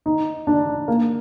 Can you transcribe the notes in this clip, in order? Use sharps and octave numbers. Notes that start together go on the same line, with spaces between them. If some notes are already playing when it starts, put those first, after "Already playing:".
D#4
D4
A#3